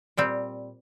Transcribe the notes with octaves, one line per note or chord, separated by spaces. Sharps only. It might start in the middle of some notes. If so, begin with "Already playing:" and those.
A#2 G3 C4